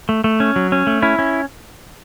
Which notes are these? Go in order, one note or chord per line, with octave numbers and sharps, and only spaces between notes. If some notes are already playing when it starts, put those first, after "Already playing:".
A3
A3
C#4
F#3
C#4
A3
C#4 E4
C#4